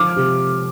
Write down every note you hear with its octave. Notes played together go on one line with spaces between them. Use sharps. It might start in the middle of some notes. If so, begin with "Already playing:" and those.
Already playing: F3 D6 F6
C3